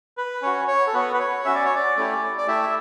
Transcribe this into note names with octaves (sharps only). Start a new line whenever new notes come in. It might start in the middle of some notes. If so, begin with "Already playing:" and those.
B4
C#4 F#4 C#5
C#5
A4
B3 F#4 B4
B4
C#5
C#4 F#4 E5
D5
C#5
D5
A3 C#4 E4 G4
D5
A3 E4 G4 E5